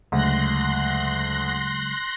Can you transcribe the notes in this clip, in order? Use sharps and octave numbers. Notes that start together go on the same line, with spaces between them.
D2 C#3 F#3 G#3 C6 F#6 A#6